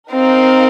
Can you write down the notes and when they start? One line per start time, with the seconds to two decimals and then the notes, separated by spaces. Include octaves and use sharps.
0.11 C4 D#4 A#4 F5